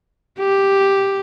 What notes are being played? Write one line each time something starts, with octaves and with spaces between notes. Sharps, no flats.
G4